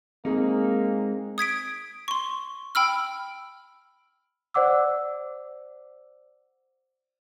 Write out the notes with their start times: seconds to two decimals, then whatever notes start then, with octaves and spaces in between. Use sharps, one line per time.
0.25 G#3 A#3 C4 D#4 G#4
1.38 D#6 G#6 B6 D7
2.08 C6 C#6
2.75 G5 B5 E6 F6
4.54 C5 D5 F#5 D6 E6